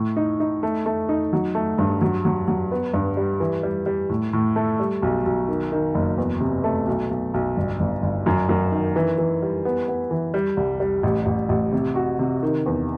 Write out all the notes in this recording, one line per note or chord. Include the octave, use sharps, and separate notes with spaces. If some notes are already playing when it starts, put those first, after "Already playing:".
Already playing: A2
D#4
D#4
A3
A3
D#4
F#3
A3
G2
F#3
F#3
F#3
B3
G2
G3
E3
G3
G3
A2
A2
A3
G3
B1
B1
D#3
D#3
F#1
E2
C3
A3
B1
B1
B1
G1
G1
G1
F#2
F#2
D#3
E3
E3
G3
B3
B3
E3
G3
C2
G3
A1
A1
A1
C3
F#4
C3
D#3
E2